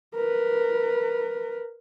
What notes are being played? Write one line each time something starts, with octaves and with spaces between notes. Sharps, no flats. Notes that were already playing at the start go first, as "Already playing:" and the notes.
A#4 B4